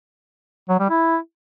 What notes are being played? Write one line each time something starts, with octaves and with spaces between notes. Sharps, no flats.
F#3
G3
E4